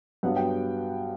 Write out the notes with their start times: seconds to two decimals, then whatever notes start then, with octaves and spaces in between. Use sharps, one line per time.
0.23 G2 F#3 B3 F#5
0.36 G5